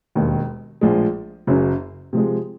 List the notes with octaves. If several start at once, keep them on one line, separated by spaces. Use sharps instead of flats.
E1 D#2 D#3
A#1 A2 F3 G#3
F#1 F#2 C#3 F#3
C3 F3 G#3